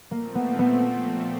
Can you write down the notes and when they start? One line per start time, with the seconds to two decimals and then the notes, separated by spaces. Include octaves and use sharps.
0.11 A#2 F3 A3 A#3 C4
0.35 B3
0.59 B3